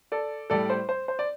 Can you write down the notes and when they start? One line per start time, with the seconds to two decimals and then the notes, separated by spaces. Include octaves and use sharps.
0.12 A4 D5
0.50 A2 G3 A4 D5
0.70 C5
0.89 C5
1.08 C5
1.19 D5